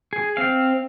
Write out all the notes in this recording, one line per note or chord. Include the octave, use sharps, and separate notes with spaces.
G#4
C4 F5